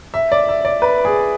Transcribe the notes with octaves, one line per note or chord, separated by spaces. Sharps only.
E5
D5
E5
D5
B4
G#4